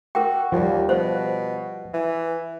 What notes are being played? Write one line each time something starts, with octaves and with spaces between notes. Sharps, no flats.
F#4 A#4 G5
D#2 F3 G3
B2 C5
E3